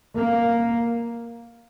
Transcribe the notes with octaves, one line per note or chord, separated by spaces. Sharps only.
A#3